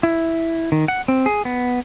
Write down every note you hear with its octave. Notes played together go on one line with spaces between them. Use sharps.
E4
D#3
F#5
C4
G#4
B3